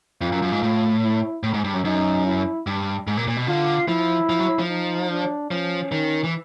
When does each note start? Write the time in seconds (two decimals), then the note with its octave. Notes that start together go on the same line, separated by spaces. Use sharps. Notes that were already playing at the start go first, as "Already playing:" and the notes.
0.21 F2 F4
0.32 F#2
0.42 F#2
0.52 G#2
0.63 A2
1.03 E4
1.43 A2
1.54 G#2
1.64 G2
1.74 F#2
1.84 F#2 D#4
2.26 E4
2.67 G2
3.07 G#2
3.17 A#2
3.28 A#2
3.37 B2
3.47 D3 F4
3.88 F3 E4
4.29 F3
4.39 F#3
4.59 F3
4.69 D#4
5.10 D4
5.50 F3 C#4
5.92 D#3
6.24 E3